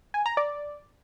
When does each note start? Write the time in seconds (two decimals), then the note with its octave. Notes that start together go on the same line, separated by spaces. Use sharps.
0.14 G#5
0.26 A#5
0.37 D5